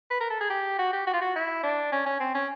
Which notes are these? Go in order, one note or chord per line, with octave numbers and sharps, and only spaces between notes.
B4
A#4
A4
G#4
G4
F#4
G4
F#4
F4
F#4
E4
D4
C#4
C#4
C4
C#4